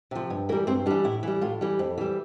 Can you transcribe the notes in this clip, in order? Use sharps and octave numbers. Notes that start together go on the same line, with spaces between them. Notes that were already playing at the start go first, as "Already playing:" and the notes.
C3 F3
G2
E3 G3 A#4
G2 C4
E3 G3 D4
A2 E4
E3 G3
A2 F4
E3 G3
F2
E3 G3